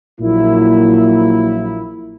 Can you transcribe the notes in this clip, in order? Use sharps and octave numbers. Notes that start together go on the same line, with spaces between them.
A#1 A#2 F#3 A#3 E4